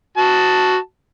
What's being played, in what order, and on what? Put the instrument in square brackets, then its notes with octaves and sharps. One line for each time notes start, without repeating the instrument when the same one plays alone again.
[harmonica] F#4 A5